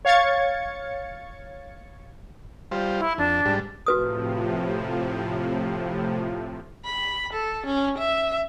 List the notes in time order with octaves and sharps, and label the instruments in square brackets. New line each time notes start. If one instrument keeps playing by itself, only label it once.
[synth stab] C#5 F5 G#6 A6 C#7
[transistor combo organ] G3 F4 C5
[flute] E4
[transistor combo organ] F2 [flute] D4
[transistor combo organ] G#2 G3
[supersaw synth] A2 C3 F3 [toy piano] F#4 B4 D#6
[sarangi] B5
A4
C#4
E5